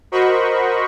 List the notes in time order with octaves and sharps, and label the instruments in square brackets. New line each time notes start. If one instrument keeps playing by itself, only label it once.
[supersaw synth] F#4 A#4 C5 D#5 B5 C#6